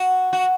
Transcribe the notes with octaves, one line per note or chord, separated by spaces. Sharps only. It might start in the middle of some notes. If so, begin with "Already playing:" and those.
Already playing: F#4
F#4